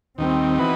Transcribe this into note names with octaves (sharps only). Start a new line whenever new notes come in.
D#2 D#3 G3 C4
E3 B3 D#4 F#4 B4